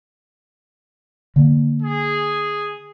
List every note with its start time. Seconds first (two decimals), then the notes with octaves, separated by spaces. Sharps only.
1.36 D3 A#3
1.82 G#4